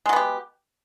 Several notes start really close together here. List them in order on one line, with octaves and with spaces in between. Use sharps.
G#3 F#3 B3 G4